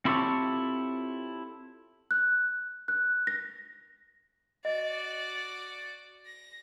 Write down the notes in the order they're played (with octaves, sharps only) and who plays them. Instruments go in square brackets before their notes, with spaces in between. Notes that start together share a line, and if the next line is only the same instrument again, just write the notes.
[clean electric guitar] C4 E4 F4 G4 A4 C#5
[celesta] F#6
F#6
A#6
[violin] F#4 D5 [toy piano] D#5
[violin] A#6